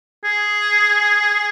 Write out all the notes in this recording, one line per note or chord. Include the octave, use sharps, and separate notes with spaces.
G#4